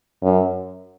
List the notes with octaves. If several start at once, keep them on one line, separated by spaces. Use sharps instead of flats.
F#2